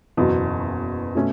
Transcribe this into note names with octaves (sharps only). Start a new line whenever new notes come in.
F#1 E2 B2 F#3
B2 A3 C#4